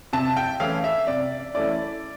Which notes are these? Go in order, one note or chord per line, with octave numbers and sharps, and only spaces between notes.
C3 A5
G5
E3 A3 C#4 E4 F5
E5
C3 D5
E3 A3 C#4 E4 D5